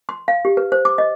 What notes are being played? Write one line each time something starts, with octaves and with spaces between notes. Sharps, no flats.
C6
F5
G4
B4
C5
D6
D#5